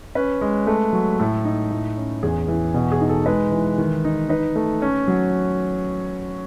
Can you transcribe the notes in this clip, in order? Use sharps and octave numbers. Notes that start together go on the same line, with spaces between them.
C#4 B4
G#3
A3
F#3
A2 A4
D#4
A2
C#4
E2 G#4
E3
B2 F#4
G#4
D#4
A4
G#3 B4
E3
D#3
D#4
D#4 B4
A3
C#4
F#3